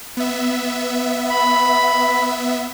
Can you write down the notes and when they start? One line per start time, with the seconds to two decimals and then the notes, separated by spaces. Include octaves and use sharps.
0.17 B3 E5
1.30 B5